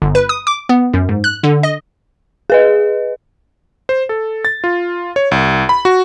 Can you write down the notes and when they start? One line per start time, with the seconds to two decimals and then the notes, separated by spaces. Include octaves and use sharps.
0.02 G1
0.15 B4
0.29 D#6
0.47 D6
0.69 B3
0.94 F#2
1.09 G#2
1.24 F#6
1.43 D3
1.63 D#5
2.50 G#4 B4 D#5
3.89 C5
4.09 A4
4.45 A6
4.64 F4
5.16 C#5
5.31 C2
5.69 B5
5.85 F#4